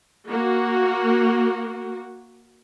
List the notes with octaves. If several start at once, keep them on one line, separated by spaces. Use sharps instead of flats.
A#3 F#4